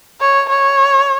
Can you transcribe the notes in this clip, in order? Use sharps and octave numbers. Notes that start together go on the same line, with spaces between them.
C#5
C#5